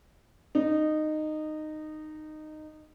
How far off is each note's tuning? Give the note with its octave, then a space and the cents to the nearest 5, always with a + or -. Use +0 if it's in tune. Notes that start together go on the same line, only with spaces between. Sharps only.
D#4 -15